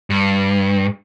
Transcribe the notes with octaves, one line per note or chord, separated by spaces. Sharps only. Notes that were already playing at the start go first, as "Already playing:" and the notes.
G2